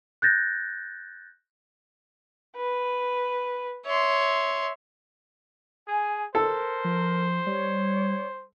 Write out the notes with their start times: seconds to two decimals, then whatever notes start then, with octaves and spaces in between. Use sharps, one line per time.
0.22 F#6 G6 A6 A#6
2.56 B4
3.86 C#5 E5 C6
5.88 G#4 G#5
6.35 A4 A#4 C5
6.84 F3
7.47 G3 C#5